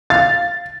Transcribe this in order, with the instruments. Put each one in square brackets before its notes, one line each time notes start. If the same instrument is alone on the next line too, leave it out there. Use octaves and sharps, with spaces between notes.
[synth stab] F5 [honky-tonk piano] A6